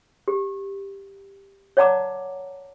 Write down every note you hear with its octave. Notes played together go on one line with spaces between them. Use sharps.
G4
C#5 D5 F#5 A5 A#5 D6